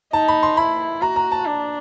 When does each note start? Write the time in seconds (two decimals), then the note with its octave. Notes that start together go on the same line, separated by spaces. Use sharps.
0.13 D#4 A5
0.28 B5
0.43 C6
0.57 E4 B5
1.02 F#4 A#5
1.16 A#5
1.32 A5
1.46 D4